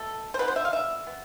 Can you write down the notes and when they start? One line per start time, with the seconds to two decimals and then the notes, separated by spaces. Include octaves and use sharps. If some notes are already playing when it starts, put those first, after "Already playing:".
Already playing: B2 A3 A4
0.34 C5
0.39 D3 F3 B3 B4
0.48 C5
0.56 E5
0.65 F5
0.73 E5
1.07 B3